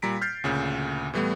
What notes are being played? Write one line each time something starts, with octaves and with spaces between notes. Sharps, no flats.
A#2 G3 A#5 B6 D7
F6 G6 A6 C7
D2 A#2 C#3
A2 E3 G3 A3 B3